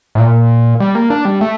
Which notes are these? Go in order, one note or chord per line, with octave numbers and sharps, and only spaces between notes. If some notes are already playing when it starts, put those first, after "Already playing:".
A2
A#2
G3
A#3
D4
G3
A3